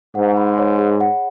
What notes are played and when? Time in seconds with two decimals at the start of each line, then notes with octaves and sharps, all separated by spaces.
0.15 G#2 F#5
0.37 B5
0.58 C#5
0.79 G#4
1.01 F#5